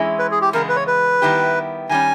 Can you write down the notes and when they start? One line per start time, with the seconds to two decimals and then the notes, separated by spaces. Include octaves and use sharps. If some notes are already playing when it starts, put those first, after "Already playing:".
Already playing: E3 G#3 C#4 E4
0.19 B4
0.31 G#4
0.41 G4
0.53 E2 C#3 G#3 B3 A#4
0.69 B4
0.76 C#5
0.87 B4
1.22 D#3 G3 B3 E4 G4
1.89 D#3 G3 C#4 G#5